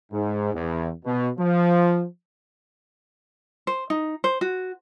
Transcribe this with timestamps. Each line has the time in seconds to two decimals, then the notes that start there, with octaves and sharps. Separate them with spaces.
0.12 G#2
0.54 E2
1.05 B2
1.38 F3
3.67 C5
3.90 D#4
4.24 C5
4.41 F#4